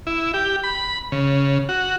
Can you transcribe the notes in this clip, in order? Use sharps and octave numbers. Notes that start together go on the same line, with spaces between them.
E4
G4
B5
C#3
F#4